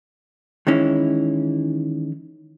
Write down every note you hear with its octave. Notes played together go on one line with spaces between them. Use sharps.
D#3 E3 G#3 C#4 E4